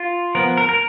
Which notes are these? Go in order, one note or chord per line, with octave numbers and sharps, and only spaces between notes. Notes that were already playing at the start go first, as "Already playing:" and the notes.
Already playing: F4
F3 B3 A#4
A#4
A#4